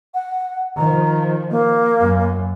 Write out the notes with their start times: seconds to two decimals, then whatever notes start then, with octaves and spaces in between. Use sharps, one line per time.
0.14 F#5
0.77 D#3 F3 A#5
1.51 A#3
2.00 F#2